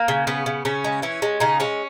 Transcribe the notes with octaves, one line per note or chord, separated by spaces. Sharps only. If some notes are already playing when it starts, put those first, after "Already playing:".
Already playing: A#3
C#3
C#3 B3
C#3
C#3 C#4
G#3
E3 C#4
G#3
C#3 D#4
G#3 C#4